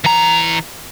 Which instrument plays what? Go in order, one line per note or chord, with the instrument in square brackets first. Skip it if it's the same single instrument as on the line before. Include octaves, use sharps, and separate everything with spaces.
[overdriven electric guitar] E3 A#5